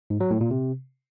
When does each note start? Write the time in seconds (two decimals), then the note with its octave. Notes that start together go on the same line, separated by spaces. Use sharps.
0.10 G#2
0.20 F#3
0.31 A2
0.41 A#2
0.51 C3